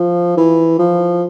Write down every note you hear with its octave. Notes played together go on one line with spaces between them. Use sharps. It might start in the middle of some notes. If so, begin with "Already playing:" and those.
Already playing: F3
E3
F3